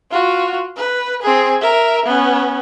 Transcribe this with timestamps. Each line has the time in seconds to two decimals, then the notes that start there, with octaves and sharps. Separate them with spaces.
0.11 F4 F#4
0.77 B4
1.22 C4 G#4
1.61 A#4 E5
2.06 B3 C#4